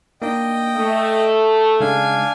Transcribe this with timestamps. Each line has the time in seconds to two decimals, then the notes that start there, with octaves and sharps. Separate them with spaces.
0.22 A#3 D4 D#4 D#5 G5
0.76 A3 D#6
1.80 C#3 G#3 D4 D#4 F5 G#5